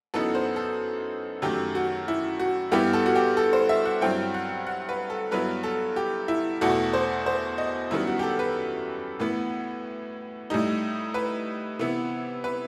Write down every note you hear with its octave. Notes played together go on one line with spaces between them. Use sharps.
F#2 E3 B3 D#4 A4
C5
A4
F#2 D#3 A3 G4
F#4
E4
F#4
G2 E3 B3 E4 G4
A4
F#4
G4
A4
C5
E5
F#5
G2 F#3 C4 E4 G5
F#5
F#5
B4
A4
G2 F#3 B3 E4 B4
A4
G4
E4
E2 B2 A3 E4 F#4
C5
C5
D#5
F#2 D#3 G3 B3 E4
F#4
G4
A4
B4
A2 E3 B3
A2 G3 D#4
B4
C3 E3 B3 E4
B4